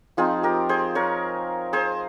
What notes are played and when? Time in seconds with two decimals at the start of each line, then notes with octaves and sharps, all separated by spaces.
0.17 F3 C4 D#4 F4 G#4
0.43 G4 A#4
0.69 G#4 C5
0.95 A#4 C#5
1.73 G#4 C5